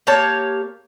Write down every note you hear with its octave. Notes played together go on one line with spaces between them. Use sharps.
A#3 G4 C#5 A5